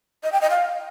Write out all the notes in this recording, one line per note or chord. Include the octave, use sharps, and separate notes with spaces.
D#5
G5
D#5
F5